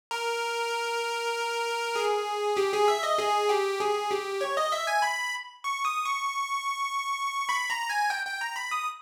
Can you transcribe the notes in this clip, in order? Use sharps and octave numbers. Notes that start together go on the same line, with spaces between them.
A#4
G#4
G4
G#4
E5
D#5
G#4
G4
G#4
G4
C#5
D#5
E5
G#5
B5
C#6
D#6
C#6
B5
A#5
G#5
G5
G5
A#5
B5
D#6